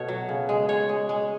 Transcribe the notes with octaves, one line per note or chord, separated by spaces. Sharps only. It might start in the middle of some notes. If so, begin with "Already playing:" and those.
Already playing: B2 A3 C#5
F#3
C#3
G#3
G#3 C#5
G#3
G#3